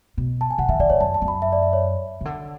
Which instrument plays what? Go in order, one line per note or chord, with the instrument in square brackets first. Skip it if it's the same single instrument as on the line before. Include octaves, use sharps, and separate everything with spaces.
[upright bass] B2
[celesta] A5
G#5
[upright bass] C#3 [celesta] F#5
[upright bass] D3 [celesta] E5
[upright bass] D3 [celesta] D5
[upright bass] C#3 [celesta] C#5
[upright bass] F#2 [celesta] A5
[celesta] A5
[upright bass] F#2
[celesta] B5
E5
D5
E5
C#5
[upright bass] C#3
D3